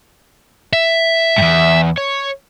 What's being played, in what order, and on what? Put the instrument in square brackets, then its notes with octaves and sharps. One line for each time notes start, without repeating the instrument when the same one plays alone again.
[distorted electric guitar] E5
[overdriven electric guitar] E2 G2
C#5